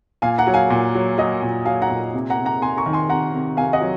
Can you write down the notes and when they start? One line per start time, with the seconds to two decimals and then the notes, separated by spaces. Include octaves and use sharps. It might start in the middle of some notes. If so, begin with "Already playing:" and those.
0.22 A#2 F5 G#5
0.38 F#5 A#5
0.47 F#3
0.54 F5 G#5
0.70 A#2
0.95 F#3
1.18 F#3 D#5
1.42 A#2
1.65 F#3 F5 G#5
1.82 F#5 A#5
1.90 A#2
2.14 C3
2.30 F#5 A#5
2.38 C3
2.45 F#5 A#5
2.62 C3 G#5 C6
2.77 A#5 C#6
2.86 D#3
2.93 G#5 C6
3.10 C3 F#5 A#5
3.33 C3
3.57 C3 F5 G#5
3.73 D#5 F#5
3.81 F#3